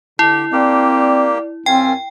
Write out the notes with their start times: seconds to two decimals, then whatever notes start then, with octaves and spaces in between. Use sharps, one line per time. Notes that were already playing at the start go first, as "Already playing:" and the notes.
0.19 D3 E4 G4
0.52 A#3 C4 G4 D5
1.66 F#2 C4 C#4 F4 A#4 G5 G#5